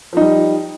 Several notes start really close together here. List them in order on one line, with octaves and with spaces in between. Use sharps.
F3 D#4 G3